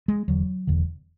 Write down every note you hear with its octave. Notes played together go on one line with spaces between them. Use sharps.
G#3
E1 E2 D3 F#3
E1 E2 D3